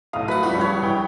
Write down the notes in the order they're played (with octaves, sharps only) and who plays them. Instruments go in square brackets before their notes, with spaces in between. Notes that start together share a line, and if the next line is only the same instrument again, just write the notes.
[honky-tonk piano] B1 A2 F5 [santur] D#6
[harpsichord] A2 F#5 [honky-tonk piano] F#3 [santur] B4
[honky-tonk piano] C#2 G2 F3 [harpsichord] G3 F#4
[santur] C#5
[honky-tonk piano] A#1 E3 G5